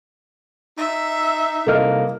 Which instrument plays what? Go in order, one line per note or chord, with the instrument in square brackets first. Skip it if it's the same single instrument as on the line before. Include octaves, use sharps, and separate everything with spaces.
[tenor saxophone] D#4 [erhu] E5
[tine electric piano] C2 A#3 [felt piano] A4 D#5 F6